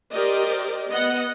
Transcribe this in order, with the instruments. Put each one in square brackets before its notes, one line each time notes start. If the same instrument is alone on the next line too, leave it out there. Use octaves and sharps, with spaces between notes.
[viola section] G4 A#4 C5 D5 D#5
B3 D#5 F#5